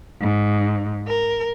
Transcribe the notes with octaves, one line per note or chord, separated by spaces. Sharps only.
G#2
A#4